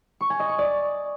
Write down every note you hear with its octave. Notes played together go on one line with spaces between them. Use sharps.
C#6
G#5
D#5
C#6
D5